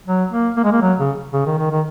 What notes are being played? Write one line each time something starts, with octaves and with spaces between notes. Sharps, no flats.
F#3
A#3
A#3
G#3
A#3
F#3
C#3
C#3
D#3
D#3
D#3